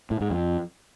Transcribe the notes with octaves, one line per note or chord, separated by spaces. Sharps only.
A2
G#2
F2